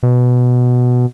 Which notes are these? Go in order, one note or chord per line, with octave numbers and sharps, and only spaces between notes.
B2